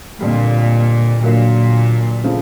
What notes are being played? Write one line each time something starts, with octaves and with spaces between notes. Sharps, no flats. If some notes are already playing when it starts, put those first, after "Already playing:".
F2 A#2 D3 G3
A#2 D3 F#3 A#3 D4 F4
C#3 F3 A3 C4 F4